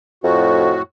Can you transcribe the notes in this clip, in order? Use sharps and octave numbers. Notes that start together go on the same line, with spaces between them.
F2 A2 F#4